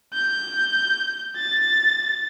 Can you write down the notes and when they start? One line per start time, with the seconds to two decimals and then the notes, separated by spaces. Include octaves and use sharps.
0.14 G6
1.37 A6